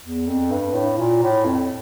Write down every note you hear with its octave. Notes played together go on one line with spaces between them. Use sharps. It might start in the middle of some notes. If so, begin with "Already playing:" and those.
E2
F2
G2
A2
A#2
A2
F2